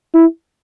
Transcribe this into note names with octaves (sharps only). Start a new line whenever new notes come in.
E4